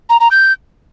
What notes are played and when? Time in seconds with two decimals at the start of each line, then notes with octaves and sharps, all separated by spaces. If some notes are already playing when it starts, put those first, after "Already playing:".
0.10 A#5
0.20 A#5
0.31 G6